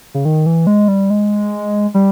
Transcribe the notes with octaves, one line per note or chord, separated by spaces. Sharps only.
C#3
D#3
E3
G#3
G3
G#3
G3